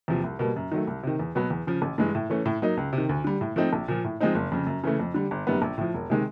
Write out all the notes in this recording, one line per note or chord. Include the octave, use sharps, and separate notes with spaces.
E2 C3 F3
C2
B2 G3 A#3
F#2
D#3 F#3 A3
C2
C3 D#3
E2
B2 F#3 B3
E2
C#3 F3
A1
G2 E3 G#3
A2
E3 A3 C#4
A2
F#3 A#3 D#4
C#2
C3
D#3
D2
D3 G3
A2
F3 A3 C4 D#4
A#1
A#2 F3
A2
F3 G#3 C4 D#4
F#1
F2 C#3
F#2
C#3 E3 A3
F2
D3 G3
G1
F#2 D#3 G3 B3
A#1
A2 F3
E1
C3 D#3 G#3